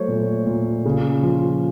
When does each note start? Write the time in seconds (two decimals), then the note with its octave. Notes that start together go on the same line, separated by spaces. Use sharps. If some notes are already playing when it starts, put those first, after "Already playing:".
Already playing: F#3 A3 C5 C#5
0.08 A#2
0.46 A#2
0.85 C#3
1.23 F3